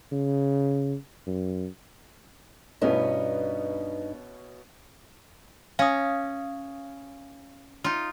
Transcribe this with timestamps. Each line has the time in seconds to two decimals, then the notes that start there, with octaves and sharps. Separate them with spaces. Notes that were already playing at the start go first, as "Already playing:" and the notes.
0.12 C#3
1.27 F#2
2.81 G2 B2 B3 C#4 D#4 E4
5.79 C#4 F5 D#6
7.84 D#4 F4